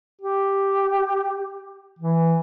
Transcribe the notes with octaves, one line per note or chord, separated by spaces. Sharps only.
G4
E3